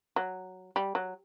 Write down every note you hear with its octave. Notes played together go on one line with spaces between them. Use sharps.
F#3
G3
F#3